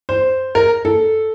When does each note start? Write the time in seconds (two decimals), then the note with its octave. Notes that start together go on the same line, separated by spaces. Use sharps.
0.09 C5
0.55 A#4
0.85 A4